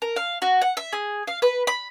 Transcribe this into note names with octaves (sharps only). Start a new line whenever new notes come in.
A#4
F5
F#4
F#5
E5
G#4
F5
B4
B5